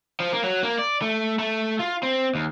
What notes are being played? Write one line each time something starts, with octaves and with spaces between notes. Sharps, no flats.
F3
A#3
F#3
A#3
D5
A3
A3
F4
C4
D#2